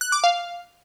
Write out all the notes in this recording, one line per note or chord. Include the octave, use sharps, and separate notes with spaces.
F#6
D6
F5